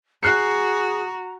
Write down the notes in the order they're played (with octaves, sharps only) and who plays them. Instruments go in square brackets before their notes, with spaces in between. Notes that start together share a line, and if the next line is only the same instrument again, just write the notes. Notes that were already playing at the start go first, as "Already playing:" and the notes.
[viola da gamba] F#4 [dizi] G#4 [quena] A#5 [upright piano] F#6 C7 C#7